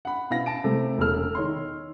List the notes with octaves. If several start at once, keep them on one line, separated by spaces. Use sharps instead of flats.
F#5 B5
B2 E4 F5 B5 A#6
A5 D7
C3 A3
E1 C#3 G#4 A4 E6 F6
D#3 C#5 C6